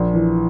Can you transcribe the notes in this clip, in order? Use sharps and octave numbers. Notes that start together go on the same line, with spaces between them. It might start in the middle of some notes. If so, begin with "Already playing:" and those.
Already playing: A#1
E3